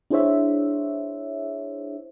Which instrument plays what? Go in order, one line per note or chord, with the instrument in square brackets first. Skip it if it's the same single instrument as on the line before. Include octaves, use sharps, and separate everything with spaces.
[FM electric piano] D4 E4 G#4 C5 C#5 E5